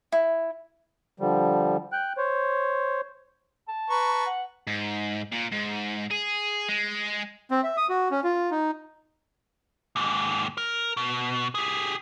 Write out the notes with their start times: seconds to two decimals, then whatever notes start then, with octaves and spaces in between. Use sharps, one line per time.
0.12 E4
1.20 D3 F3 G3
1.92 G5 F#6
2.17 C5 C#5
3.68 A5
3.90 B4 A#5 C#6
4.26 F#5
4.67 G#2
5.32 A#2
5.52 G#2
6.11 G#4
6.69 G#3
7.51 C4
7.63 E5
7.77 D#6
7.89 F#4
8.11 C#4
8.24 F4
8.51 D#4
9.96 D#2 G#2
10.57 A#4
10.97 B2
11.55 G4 G#4